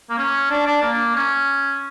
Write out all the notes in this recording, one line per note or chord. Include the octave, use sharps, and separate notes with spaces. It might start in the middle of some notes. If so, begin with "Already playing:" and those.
A#3
C#4
D4
D4
A#3
C#4